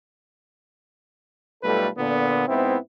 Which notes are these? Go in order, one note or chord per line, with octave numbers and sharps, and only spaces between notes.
B1 G3 A3 F4 A4 B4
A#2 D3 B3
G#2 B3 C4 E4